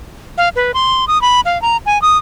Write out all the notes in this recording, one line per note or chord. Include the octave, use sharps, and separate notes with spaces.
F5
B4
C6
D#6
B5
F5
A#5
G#5
D#6